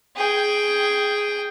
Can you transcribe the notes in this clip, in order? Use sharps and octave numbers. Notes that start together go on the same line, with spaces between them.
G#4 G5